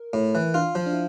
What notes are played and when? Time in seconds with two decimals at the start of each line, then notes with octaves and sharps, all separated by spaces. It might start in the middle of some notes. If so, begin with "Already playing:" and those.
Already playing: A#4
0.13 A2
0.35 E3
0.54 D4 F4
0.75 F3
0.86 D4
0.93 E4